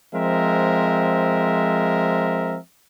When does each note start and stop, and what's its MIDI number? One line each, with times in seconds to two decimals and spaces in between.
0.14 2.58 53
0.14 2.58 56
0.14 2.58 60
0.14 2.58 70
0.14 2.58 76